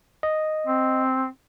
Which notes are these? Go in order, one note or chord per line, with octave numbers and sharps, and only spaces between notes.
D#5
C4